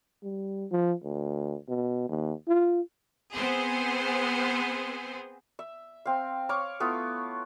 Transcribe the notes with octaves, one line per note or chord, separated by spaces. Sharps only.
G3
F3
D2
B2
D#2
F4
B3 C4 G#4 C5
E5
C4 F5
C#5 F5 C#6 D6
A3 B3 E4 F4